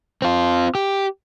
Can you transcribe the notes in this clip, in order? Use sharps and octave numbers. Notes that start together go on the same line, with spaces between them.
C4 F4
G4